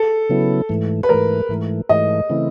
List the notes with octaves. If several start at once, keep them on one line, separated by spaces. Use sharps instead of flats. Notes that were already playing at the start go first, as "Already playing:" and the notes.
Already playing: A4
C#3 F#3 B3 E4
G#2 E3 A3
B4
G#2 E3 A3 A#4
G#2 E3 A3
G#2 E3 A3 D#5
C#3 E3 A3 C4 E4